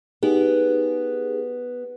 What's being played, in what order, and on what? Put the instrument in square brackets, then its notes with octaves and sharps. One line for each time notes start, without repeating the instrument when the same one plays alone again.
[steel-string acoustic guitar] B3 [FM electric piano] D#4 G4 G#4